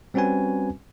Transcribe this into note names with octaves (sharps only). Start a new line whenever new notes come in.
G3 C4 C#4 F#4 B4 G#5